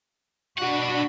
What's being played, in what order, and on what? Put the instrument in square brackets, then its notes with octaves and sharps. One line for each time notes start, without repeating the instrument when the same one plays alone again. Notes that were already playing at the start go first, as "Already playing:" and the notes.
[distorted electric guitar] B2 F#5 [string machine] D4 B5 [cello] F#4